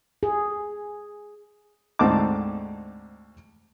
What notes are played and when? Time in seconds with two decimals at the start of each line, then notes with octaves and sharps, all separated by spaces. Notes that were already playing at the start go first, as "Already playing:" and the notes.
0.23 G#4
1.99 D2 G#2 C4 D#4 A5 D6